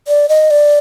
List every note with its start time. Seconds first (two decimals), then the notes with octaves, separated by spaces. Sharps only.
0.08 D5
0.29 D#5
0.51 D5